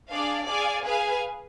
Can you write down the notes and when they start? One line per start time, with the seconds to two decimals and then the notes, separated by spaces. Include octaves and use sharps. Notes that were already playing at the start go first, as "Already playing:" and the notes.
0.12 D4 G#4 D5 F5
0.48 G#4 D5 F5 G#5
0.84 G#4 B4 F5 G#5